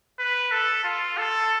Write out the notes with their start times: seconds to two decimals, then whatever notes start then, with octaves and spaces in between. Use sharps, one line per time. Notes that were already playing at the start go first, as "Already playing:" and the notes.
0.19 B4
0.52 A4
0.84 F4
1.17 A4